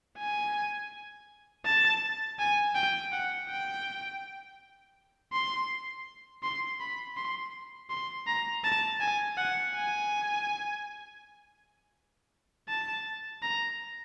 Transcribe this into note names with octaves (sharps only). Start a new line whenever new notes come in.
G#5
A5
G#5
G5
F#5
G5
C6
C6
B5
C6
C6
A#5
A5
G#5
F#5
G#5
A5
A#5